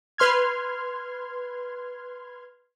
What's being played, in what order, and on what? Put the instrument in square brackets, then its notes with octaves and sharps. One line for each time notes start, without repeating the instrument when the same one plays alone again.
[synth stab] B4 C6 F6 G#6